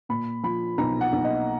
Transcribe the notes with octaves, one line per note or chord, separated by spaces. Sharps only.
A#2 B5
F3 B5
B1 A#5
F#5
B1
D#5